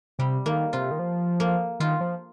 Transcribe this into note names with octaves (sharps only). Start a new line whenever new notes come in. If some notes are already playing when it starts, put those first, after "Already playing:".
C3 G3
D#3 A#3
C3 F4
D#3
F3
A#3
D#3 F4
F3